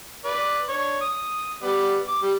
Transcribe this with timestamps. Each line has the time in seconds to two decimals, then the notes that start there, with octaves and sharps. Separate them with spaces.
0.25 B4 D5
0.69 D4 C#5
1.01 D#6
1.63 G3 B3 D5
2.08 D6
2.23 G3